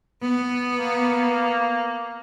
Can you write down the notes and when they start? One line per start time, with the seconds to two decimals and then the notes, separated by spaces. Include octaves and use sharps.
0.22 B3
0.79 A#3